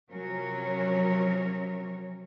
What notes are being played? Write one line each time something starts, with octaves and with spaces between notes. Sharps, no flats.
C3 F3 F#3 C#4 A#4 C#5